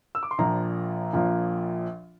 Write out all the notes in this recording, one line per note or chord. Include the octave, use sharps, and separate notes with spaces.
E6
D6
C6
A#1 A#2 F3 A#5
A#1 A#2 F3